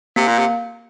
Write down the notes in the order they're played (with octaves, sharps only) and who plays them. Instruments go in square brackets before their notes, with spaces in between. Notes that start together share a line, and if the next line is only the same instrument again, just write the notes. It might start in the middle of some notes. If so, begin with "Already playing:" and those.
[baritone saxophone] C3 [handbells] A#3
[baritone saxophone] A#2
C3